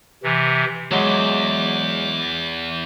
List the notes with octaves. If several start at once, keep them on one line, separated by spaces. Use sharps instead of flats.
C3 E3
E2 F#3 G#3 D6